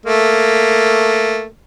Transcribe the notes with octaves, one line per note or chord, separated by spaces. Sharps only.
A3 A#3